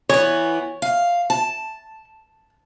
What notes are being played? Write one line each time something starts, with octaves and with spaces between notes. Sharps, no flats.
E3 B3 C#5
F5
A5